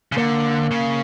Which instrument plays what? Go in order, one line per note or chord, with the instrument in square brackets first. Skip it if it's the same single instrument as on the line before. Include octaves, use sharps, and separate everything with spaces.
[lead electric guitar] C#3
[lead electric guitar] D3 [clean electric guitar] A#3
[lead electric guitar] C#3